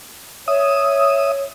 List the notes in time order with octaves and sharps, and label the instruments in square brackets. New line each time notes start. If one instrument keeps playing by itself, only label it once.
[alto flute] C#5 [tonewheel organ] E5 D#6